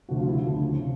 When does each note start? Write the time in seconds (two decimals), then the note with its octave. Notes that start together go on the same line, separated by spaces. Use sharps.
0.09 D2 C3 F3 F#4
0.19 F4
0.28 E4
0.37 F4
0.44 D2 C#3 F3
0.80 C3